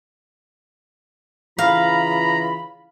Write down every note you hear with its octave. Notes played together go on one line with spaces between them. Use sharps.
C#3 E3 F4 F5 A#5 B5